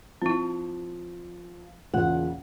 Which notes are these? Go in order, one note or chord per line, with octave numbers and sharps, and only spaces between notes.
F3 C4 E4
E2 A#2 C#3 F#5